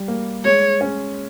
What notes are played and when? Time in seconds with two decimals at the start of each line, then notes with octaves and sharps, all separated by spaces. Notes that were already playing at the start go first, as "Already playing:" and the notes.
Already playing: G3
0.08 A#3
0.45 G#3 C#5
0.81 C#4